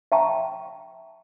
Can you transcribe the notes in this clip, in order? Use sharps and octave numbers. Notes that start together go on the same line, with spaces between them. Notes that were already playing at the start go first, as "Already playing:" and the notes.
E5 G5 A5 A#5 C#6